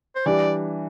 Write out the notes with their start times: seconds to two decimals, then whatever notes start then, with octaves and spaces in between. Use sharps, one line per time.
0.16 C5
0.26 E3 G3 D4 G4 D5